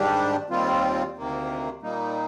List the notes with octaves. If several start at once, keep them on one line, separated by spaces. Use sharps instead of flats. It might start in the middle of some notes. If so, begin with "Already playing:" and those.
Already playing: G#2 D#3 G3 D4 G4
D#2 D#3 G3 C4 F4
D2 C3 D#3 A#3
A#2 G3 A#3 D#4